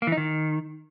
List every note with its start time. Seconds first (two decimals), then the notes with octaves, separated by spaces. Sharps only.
0.02 A#3
0.07 E3
0.12 D#4
0.17 D#3